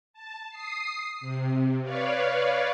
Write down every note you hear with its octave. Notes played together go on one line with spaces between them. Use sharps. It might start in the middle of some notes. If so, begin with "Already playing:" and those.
A5
D#6 C7
C3
B4 C#5 D5 F5